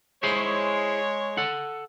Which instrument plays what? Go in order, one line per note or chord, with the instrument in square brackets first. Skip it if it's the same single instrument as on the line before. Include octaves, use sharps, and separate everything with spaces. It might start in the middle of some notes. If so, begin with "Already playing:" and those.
[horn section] G#3 C#5 [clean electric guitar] E4 G#4 C5
[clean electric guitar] A4 F#5